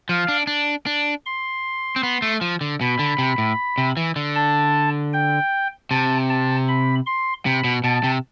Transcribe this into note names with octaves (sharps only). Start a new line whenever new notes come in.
F3 F5
D4
D4
D4
C6
C4
B3
A3
F3
D3
B2 B5
D3
C3
A2
C3
E3
D3
A5
G5
C3 A5
A5
B5
C6
C3 B5
B2
B2 A5
C3